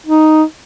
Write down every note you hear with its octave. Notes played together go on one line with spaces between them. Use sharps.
D#4